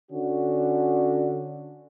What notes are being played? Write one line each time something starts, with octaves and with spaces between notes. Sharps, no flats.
D3 C#4 F#4